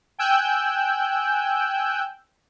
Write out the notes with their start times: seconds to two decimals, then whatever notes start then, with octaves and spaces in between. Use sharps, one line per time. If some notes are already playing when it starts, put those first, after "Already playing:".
0.18 G5 G#5 E6 F#6 G6